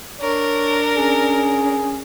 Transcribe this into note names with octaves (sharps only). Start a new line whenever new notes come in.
D4 A#4 C#5
C#4 G#4